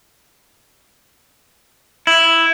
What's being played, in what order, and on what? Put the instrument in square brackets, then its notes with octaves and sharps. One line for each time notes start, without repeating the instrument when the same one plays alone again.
[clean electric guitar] E4